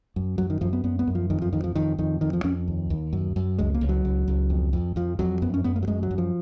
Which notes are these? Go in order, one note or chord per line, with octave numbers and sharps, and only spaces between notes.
F#2
F#2 F#3
D#3
F#2 F3
B3
F#2 B3
B3
F#2
F3
F2 D#3
F3
F2 D#3
F3
F2 D#3
F2 D#3
F2 D#3
F3
F2 C#4
D#2
D#2
F#2
F#2
C#2 G#3
A#3
C#2
F#3
C#2
C#2
F2
F2
F2 F3
F2 F#3
F#2 B3
C#4
F#2 B3
A#3
F#3
F#2 G#3
F#3
F#2
F3